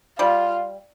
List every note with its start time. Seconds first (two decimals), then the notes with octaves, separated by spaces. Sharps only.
0.19 G3 F4